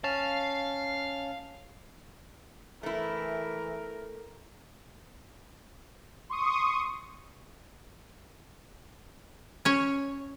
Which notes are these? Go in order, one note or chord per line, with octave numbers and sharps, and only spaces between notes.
C#4 F5 A5
E3 A3 E4 A#4
C6 C#6 D#6
C#4 C#5